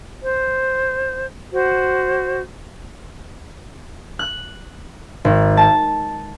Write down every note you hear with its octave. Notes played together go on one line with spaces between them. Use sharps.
C5
F#4 C5
F#6
G#1
A5